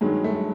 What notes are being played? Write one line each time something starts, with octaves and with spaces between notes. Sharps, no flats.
G2 D#3 F#3 G#3
A3